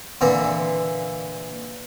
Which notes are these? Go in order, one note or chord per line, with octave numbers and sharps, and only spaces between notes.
A#2 D3 E3